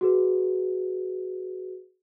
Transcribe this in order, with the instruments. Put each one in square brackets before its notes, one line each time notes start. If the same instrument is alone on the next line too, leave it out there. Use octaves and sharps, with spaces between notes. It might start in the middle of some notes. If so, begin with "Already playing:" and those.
[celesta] F#4 G#4 B4